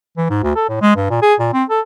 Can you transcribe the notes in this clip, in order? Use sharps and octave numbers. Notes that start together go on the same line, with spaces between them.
E3
G#2
D2
A4
A2
G#3
G2
A#2
G#4
A#2
C4
A4